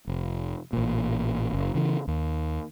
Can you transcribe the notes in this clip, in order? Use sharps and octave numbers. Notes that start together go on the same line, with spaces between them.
F1
A1 A#2
F#1
C#3 E3
D#2